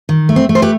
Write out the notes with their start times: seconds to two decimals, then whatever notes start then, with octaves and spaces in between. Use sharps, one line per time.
0.09 D#3
0.29 A3
0.36 C4
0.49 A3
0.55 C5
0.62 G4 B4